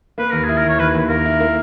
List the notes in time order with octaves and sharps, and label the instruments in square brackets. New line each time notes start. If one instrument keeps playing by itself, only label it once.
[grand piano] A#3 [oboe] B4
[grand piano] D#2 [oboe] A#4
[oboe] G#4
[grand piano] E4
[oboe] A#4
[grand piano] D#2 [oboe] C#5
[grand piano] D#2 [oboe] B4
[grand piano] D#2
[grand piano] A#3 [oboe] A#4
[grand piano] E4
A#3